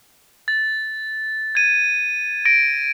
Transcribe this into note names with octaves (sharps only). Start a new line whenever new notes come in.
A6
G#6 D#7
A#6 D7